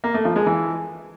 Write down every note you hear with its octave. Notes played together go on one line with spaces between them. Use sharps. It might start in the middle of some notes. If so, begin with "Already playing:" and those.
A#3
A3
F3
G#3
E3